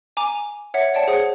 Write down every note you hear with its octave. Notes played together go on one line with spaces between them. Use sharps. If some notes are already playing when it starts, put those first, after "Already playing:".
G#5 A#5 D6 D#7 F7
C#5 E5 F#5
C#5 D5 F#5 G5 A5
G#4 C5 C#5 F#5 D#6